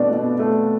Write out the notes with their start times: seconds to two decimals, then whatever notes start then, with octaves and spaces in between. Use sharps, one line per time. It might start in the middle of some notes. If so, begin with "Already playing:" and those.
Already playing: B2 A3 B3 C4 D4 D5
0.11 B2
0.39 A3